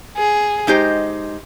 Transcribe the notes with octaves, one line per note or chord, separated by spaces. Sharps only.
G#4
G#3 D#4 G4 C5